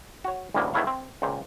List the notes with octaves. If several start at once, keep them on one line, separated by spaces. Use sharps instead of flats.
F#4 C#5
A1 D2 A2 G3 G#3 A#3
E2 D#3 A3 E4 C#5 F5
C4
C#2 A#2 C5